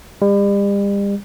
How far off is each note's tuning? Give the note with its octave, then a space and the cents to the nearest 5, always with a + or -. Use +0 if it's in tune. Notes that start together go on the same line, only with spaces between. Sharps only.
G3 +40